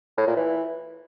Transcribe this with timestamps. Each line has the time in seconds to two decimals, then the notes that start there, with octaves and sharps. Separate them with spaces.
0.17 A2
0.27 A#2
0.37 E3